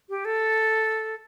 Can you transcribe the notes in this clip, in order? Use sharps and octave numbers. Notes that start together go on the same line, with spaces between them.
G4
A4